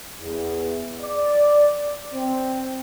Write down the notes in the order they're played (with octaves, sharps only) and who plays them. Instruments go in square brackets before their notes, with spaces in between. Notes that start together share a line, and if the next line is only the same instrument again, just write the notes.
[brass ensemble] E2
D5
C4